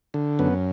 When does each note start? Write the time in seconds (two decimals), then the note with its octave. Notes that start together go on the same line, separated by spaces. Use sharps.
0.14 D3
0.39 F#2 B3